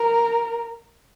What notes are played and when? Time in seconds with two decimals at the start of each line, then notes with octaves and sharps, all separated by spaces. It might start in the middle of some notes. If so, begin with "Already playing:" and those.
Already playing: A#4